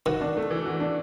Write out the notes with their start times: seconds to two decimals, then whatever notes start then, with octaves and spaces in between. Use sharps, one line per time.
0.06 D#3 F#4
0.21 D4
0.37 A3
0.50 E3
0.65 F#4
0.80 D4